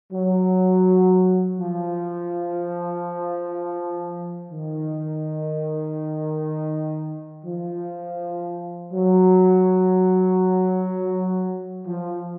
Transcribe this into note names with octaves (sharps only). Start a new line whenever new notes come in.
F#3
F3
D#3
F3
F#3
F3